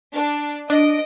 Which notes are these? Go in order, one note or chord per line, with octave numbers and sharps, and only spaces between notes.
D4
D4 D#5 D7